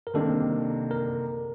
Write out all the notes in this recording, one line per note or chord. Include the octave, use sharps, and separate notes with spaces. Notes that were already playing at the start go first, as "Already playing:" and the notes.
A#4
C2 C3 D#3 A#3 D4 A4
A#4